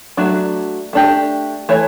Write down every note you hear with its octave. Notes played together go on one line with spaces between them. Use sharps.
F#3 A3 D4 F#4
A3 D4 G4
E3 A3 C#5